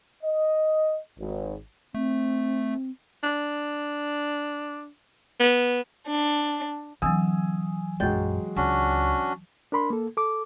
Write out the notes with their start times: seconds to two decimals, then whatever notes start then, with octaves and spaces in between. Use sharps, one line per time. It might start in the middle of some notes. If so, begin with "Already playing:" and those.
0.23 D#5
1.19 G#1
1.95 A3 C4
3.23 D4
5.40 B3
6.07 D4
7.02 D3 E3 F#3 C4 G#5 D#6 E6
8.00 A#1 F#2 F#3 G#3 G5 G6 A6
8.56 C#2 C#4 D4 F#4
9.72 D4 A#4 B5 C6
9.90 A#3 A4
10.17 A4 D6